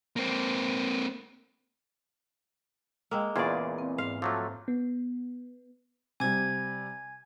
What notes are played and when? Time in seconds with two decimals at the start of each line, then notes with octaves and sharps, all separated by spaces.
0.16 A#3 C4
3.11 G#3 A#3 G5 E6
3.36 E2 A#2 C#3 F4 G#4 D5 C#6 G#6
3.78 C4
3.98 G#2 F5
4.22 F3 F#3 A3 D6 E6
4.68 B3
6.20 C3 G3 G#5 G#6